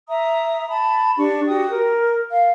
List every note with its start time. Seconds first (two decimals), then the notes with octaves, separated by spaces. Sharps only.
0.08 E5 A#5 D#6
0.68 A5 B5
1.17 D4 G4 C#6
1.47 F#4 G4 G5 D#6
1.69 A#4
2.30 F5